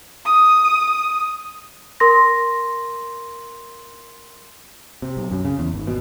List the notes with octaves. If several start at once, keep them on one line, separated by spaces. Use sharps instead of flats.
D#6
A#4 C6 A#6
C3
B1
F#2
C#3
E2
G#1
B2